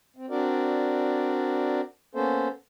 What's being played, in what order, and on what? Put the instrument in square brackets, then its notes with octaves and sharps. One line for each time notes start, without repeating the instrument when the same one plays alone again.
[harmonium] C4
C4 D4 F#4 A#4 D5
A#3 B3 C#4 A4 C5